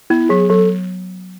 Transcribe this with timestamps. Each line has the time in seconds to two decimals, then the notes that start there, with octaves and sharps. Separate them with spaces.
0.10 B3 E4
0.29 F#3 G#4
0.49 F#3 A4